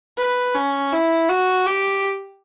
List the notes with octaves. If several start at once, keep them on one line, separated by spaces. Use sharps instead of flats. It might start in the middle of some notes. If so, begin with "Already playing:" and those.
B4
C#4
E4
F#4
G4